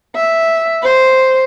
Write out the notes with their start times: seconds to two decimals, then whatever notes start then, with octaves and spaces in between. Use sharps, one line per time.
0.16 E5
0.83 C5